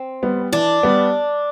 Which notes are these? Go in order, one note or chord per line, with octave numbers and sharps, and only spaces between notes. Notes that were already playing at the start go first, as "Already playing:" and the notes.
Already playing: C4
G3 B3
E3 D4
G3 B3